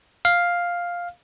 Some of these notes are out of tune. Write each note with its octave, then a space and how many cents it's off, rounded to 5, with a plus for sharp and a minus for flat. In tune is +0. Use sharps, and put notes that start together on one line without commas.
F5 +5